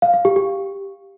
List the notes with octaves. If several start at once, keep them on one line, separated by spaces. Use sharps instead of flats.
F5
F5
G4
G4